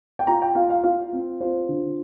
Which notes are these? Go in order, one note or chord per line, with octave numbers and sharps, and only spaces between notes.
G5
F4 A#5
G5
F4 F5
F5
F4 F5
C4
F4 C5
D3